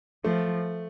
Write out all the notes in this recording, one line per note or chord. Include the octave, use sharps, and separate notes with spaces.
F3 A3